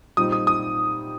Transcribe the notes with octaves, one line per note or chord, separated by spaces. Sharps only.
A#2 G3 C4 D#4 D#6
D#6
D#6